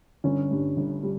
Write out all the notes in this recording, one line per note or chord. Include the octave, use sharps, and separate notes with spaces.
G1 C#4
G2 G3
G1
G3